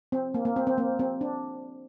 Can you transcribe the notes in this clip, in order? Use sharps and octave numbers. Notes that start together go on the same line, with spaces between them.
C4
A#3
A#3
C4
C4
A#3
C4
D4